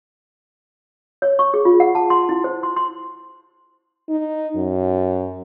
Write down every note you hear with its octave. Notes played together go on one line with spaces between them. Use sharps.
C#5
C#6
G#4
F4
F#5
A5
C6
E4
C5
C6
C6
D#4
F#2